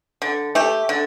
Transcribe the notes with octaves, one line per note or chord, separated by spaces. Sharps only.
D3
A3 G4
D3